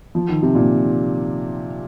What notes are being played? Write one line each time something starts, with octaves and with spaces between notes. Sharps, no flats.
F3
D#3
C3
A#2